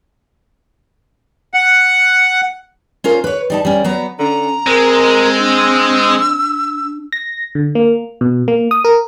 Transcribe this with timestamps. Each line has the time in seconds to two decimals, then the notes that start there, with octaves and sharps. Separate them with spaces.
1.54 F#5
3.04 C#4 F4 A#4 C5
3.24 B4 C#5
3.50 G3 D#4 A5
3.65 G3 C#4
3.84 F#3 B3 A#5
4.19 D3 C#4 A#5
4.67 G#3 C4 A#4
5.38 D4 E6
7.13 A#6
7.55 D3
7.75 A#3
8.21 B2
8.48 A#3
8.71 D#6
8.85 A#4